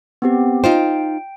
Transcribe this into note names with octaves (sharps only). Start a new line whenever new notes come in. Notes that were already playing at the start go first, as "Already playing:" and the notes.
B3 C4 G4
D#4 F4 C5 G5